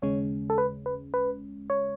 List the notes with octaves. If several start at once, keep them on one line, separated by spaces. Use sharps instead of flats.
D#2 C#3 G#3 C#4 C#5
A4
B4
B4
B4
C#5